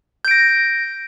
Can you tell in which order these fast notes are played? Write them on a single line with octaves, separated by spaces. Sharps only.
G6 D7 A#6